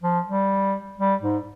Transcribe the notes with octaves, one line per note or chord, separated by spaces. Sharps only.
F3
G3
G3
G#2